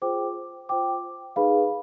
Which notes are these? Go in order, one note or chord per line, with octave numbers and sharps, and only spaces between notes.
F4 G#4 C5 G5 D6
F4 C5 G5 D6
D#4 G#4 B4 F5 B5